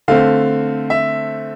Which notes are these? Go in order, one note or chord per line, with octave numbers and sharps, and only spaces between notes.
D3 A3 C4 F5
E5